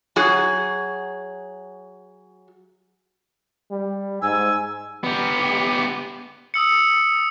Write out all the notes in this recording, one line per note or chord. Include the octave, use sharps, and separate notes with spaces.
F#3 F#4 G#4
G3
G#2 G#5 E6
B3 G4
D#6 E6 C#7